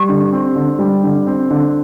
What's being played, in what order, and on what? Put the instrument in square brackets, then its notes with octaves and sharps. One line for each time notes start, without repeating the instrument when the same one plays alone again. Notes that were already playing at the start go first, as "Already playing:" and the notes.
Already playing: [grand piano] G3 [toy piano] G4
[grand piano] D3
C4
D3
G3
D3
C4
D3